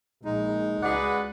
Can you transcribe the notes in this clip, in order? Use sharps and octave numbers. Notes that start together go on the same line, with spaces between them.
A#1 G#3 D#4
C#2 F#4 G#4 B4 D5 F#5